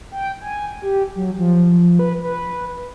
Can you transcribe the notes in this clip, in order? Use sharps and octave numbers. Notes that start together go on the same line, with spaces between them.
G5
G#5
G4
F#3
F3
B4
B4